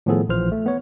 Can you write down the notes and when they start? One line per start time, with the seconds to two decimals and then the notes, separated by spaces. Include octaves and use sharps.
0.06 A2 D#3 F3 B3 G#4 A4
0.29 A#1 E3 F3 C5 F6
0.52 A3
0.66 B3 C#5